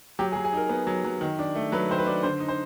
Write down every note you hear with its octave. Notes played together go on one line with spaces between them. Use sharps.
F#3 G4
G#4
F#3
G#4
D#4 A#4
B3
F#3
F#3
D#3
D4
A3
F#3 B4
D#3 C5
B4
D4
D3 C5
D#4
C5